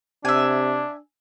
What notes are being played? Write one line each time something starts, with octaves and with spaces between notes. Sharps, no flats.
C3 D4 E5 G#5